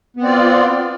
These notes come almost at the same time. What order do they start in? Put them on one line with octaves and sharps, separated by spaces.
B3 C4 D5 F4